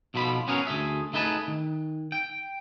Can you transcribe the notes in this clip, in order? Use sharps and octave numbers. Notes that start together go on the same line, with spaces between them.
B1 B2 F3 G#4 B5
B3 C#4 F#4 G#4 A#4 C#5
D2 A3 G#4 E5
A3 D#4 G#4 B4 A5
D#3
G5